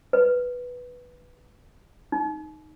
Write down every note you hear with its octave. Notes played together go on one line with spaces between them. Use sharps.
B4
D#4